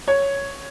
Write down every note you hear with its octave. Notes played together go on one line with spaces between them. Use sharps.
C#5